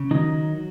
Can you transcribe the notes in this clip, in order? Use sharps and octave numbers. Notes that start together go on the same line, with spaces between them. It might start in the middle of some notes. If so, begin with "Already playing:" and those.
Already playing: C#3
D#3 F#3 D#4
F#3